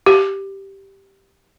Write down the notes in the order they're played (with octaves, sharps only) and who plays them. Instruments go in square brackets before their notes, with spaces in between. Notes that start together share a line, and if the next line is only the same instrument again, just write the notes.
[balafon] G4